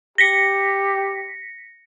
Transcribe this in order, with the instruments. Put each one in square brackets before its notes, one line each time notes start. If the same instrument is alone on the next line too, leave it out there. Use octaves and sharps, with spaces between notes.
[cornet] G4 [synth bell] A#6 B6 C#7